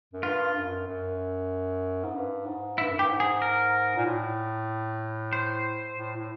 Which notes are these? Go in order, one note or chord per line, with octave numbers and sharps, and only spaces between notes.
F#2
G2 F4
F#2
F#2
G#2
G2
G#2
G2 E4
F#2
G2 G4
G#2
G#4
A#4
A#2
A2
C5
A2
A2